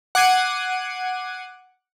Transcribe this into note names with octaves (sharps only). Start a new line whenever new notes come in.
F#5 D6 G#6 C7 D#7